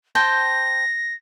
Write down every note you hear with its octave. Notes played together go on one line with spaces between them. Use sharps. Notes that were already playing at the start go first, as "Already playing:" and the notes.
C5 G5 A5 A#6